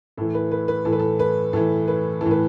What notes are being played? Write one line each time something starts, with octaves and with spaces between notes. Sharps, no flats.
A2 E3 A4
B4
B4
B4
A2 E3 A4
B4
A4
B4
A2 E3 A4
B4
A2 E3 A4
B4